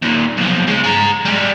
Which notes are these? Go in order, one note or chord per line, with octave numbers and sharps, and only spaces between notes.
D#2 A#2
B1 F3
G#3 C#4
G#4 A#5
G3 G#3